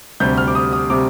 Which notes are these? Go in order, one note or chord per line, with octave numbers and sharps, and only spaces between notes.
D2 C3 G3 G6
F6
D6
D#6
D#6
C3 G3 D6